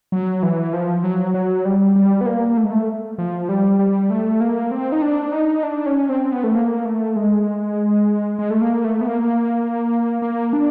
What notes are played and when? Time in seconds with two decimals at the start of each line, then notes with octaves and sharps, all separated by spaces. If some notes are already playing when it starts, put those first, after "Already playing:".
0.12 F#3
0.43 E3
0.73 F3
1.04 F#3
1.34 F#3
1.65 G3
1.96 G3
2.21 B3
2.26 A#3
2.57 A3
2.64 G#3
2.71 A3
3.18 F3
3.49 G3
3.79 G3
4.10 A3
4.41 A#3
4.71 C4
4.92 D#4
5.02 D4
5.32 D#4
5.63 D4
5.86 C#4
6.09 C4
6.32 B3
6.44 A3
6.55 A#3
6.85 A3
7.16 G#3
8.39 G#3
8.50 A3
8.62 A#3
8.84 A3
9.01 B3
9.07 A#3
10.22 A#3
10.53 D4